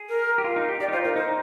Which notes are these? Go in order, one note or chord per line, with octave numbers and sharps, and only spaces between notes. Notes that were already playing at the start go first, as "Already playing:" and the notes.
Already playing: G#4
A#4
G4
F4
D#4
G4
G4 D5
D#4
F4 C5
D#4 A#4
D#4 C5